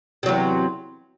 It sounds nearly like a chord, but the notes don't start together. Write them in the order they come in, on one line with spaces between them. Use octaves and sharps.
C3 F#3 E2